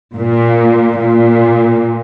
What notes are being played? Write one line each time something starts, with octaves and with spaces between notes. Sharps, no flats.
A#2
A#2